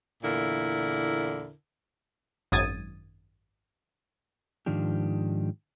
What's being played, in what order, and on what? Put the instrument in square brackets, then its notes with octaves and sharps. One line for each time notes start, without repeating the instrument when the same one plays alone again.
[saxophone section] E2 A#2 D3 E4 A#4
[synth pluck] G#1 F#2 D#6 G#6 A6 D#7
[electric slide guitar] G#2 D#3 F3 D4 G4